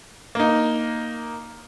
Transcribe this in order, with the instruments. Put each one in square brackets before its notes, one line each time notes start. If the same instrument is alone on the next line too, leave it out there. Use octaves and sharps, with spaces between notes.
[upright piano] A#3 D#4